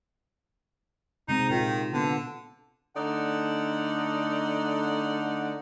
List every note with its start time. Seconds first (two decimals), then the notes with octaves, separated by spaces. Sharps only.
1.28 C3 G#3 C4 D#4
1.50 A#2 D#3 F4
1.94 D3 B3
2.96 D3 A3 D#4 D5 F#5